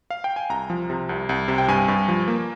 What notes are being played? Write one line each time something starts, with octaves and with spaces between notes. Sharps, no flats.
F5
G5
G#5
C2 A#5
F3
C3
C2
C2
C3
G5
G2 G#5
G2
F3
A#3